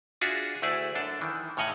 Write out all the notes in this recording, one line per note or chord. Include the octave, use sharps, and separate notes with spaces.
D4 F4 F#4 G#4 E5
D2 A3 E4 G#4 D5
F#2 D4 A4
D#3 E3
A2 C#3 C#5 D#5 F#5 G#5